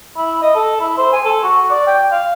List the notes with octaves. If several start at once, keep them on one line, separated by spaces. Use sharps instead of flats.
E4
D#5
A4
E4
C5
G#5
A4
F#4
D5
G5
F5